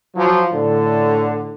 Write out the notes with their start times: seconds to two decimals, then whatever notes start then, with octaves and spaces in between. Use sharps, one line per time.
0.16 F3 F#3
0.53 A2 D3